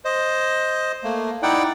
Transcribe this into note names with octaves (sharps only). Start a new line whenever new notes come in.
C5 D#5
A3 A#3
D#4 E4 D5 F#5 G5